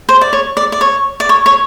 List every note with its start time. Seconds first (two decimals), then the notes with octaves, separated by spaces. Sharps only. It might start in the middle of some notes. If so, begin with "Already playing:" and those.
0.09 C5
0.21 D5
0.33 C#5
0.57 D5
0.72 D5
0.81 C#5
1.20 D5
1.29 C#5
1.46 C#5